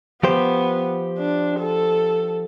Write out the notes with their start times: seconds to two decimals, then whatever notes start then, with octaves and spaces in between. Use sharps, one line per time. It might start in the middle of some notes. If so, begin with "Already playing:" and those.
0.23 F3 B3 G4 C5
1.18 D4
1.60 A4